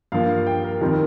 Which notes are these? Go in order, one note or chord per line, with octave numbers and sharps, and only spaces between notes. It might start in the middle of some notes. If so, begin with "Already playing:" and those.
G2 F3 A#3 F5
G5
A#4
F2 D#3 G3 C4 A#4